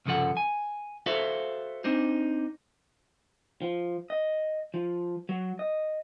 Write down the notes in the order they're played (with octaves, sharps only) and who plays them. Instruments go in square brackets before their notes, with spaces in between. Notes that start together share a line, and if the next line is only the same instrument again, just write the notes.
[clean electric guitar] C2 G2 C#3 F3 A4 F#5
G#5
F#4 A4 C5 E5 F5
C4 D4 D#4 C5
F3
D#5
F3
F#3
D#5